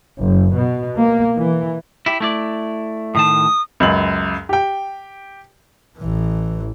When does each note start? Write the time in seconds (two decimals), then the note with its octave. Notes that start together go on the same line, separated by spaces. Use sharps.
0.20 F#1
0.55 B2
0.99 A#3
1.37 E3
2.06 E4 G4
2.20 A3 E4 D5
3.15 A2 D#3 A5 D#6
3.80 C#2 F#2 F#7
4.49 G4 G5
5.97 A1 E3